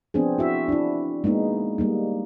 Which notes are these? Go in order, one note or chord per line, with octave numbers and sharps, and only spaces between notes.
F3 B3 C4 D4 G#4
E4 F#4 E5
D4 E4
G#3 A#3 B3 D#4
G3 A#3 D#4